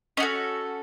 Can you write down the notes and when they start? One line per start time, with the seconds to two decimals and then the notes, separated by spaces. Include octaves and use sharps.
0.17 C#4 D#5
0.20 F#4 A4